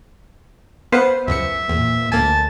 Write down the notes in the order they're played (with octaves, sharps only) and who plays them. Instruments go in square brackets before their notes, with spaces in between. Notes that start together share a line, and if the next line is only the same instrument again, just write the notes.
[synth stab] B3 B4 C5 [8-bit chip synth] F5 F#5
[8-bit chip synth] C#2 F#2 C#7 [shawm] E5
[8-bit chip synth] E2 [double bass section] A#2
[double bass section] D2 [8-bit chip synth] A#3 G#5 [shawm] A5